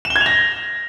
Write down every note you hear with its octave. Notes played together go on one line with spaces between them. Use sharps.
E7
G7
G#6
F7
A#6